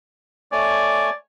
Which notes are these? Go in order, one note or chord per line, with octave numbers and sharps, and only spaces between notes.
A3 C#5 D5 G#5